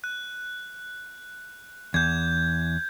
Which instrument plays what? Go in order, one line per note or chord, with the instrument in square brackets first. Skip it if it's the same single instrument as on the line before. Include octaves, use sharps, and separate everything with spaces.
[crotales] F#6
[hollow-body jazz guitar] E2 [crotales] G6 G#6